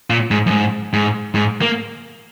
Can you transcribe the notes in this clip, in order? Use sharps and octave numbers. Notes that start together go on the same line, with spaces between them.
A#2
G#2
F#2
G#2
G#2
G#2
A#3